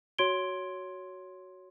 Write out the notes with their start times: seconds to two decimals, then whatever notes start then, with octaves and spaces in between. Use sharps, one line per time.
0.18 F#4 C#5 C6 G#6 D7 G7